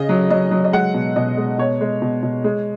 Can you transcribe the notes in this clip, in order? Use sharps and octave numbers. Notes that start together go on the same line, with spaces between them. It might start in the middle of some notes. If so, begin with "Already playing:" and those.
Already playing: C#3 D#5
F#3
F#3 D#5
F#3
D#5
G#3 F#5
B2
B2 D#5
G#3
B2 C#5
G#3
B2
B2
G#3